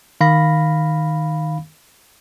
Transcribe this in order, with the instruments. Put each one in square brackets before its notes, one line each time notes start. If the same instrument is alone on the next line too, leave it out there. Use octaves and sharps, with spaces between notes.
[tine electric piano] D#3 F5 B5 A#6